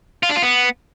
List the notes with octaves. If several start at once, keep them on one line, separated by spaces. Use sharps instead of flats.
F4
D4
F4
B3